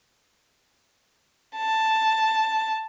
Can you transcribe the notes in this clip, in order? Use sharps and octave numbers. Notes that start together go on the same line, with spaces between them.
A5